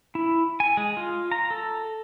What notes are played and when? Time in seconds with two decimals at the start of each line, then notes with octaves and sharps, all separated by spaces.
0.15 E4
0.60 G#5
0.77 G#3
0.97 F4
1.32 A#5
1.50 A4